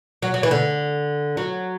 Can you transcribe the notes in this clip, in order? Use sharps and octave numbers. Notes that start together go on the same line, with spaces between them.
F#3
F#3
E3
D3
F#3